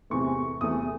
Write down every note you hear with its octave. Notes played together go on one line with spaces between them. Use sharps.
E2 C3 E3 A3 C#6
E2 C3 E3 A3 D#6